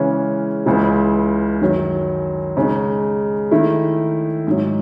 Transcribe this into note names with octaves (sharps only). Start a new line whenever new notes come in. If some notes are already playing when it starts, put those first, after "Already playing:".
Already playing: C#3 E3 G#3 C#4
C#2 C#3 E3
F#2 D#3 F#3
C#3 G#3 D#4
D#3 A3 E4
G#2 D#3 F#3